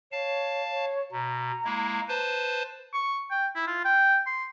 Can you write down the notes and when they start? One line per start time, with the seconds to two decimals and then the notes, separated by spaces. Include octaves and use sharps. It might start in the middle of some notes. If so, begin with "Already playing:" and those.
0.12 C#5 F5 A5
0.73 C#5
1.12 B2 A#5
1.65 G#3 A#3 E4
2.08 B4 C5 A5
2.94 C#6
3.31 G5
3.56 E4
3.67 F4
3.85 G5
4.27 C6